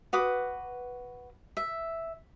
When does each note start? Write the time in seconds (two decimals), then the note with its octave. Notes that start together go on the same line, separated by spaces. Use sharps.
0.13 F#4 B4 D6 D#6
1.57 E5